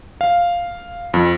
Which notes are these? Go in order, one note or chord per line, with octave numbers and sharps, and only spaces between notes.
F5
F2